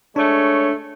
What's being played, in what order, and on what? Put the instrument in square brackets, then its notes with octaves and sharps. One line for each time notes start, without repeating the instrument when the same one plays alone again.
[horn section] G#3 A3 C#5 [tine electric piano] D4